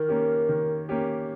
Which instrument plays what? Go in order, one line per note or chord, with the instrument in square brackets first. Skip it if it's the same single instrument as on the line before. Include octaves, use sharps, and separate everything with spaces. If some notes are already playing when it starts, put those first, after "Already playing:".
Already playing: [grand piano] D#3 [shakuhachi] A#4
[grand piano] A#3 C#4 G4
D#3
A#3 C#4 G4